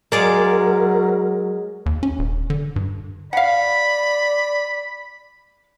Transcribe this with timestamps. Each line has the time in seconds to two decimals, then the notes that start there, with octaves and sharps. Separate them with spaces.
0.12 F#3 G#3 A#4 D5 F5
1.86 D#2
2.03 C#4
2.19 D#1
2.50 D3
2.76 G2
3.33 D5 F5 F#5 B5